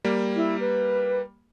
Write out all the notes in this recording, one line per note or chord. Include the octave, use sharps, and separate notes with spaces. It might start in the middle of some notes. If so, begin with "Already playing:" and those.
G3 A#3
E4
B4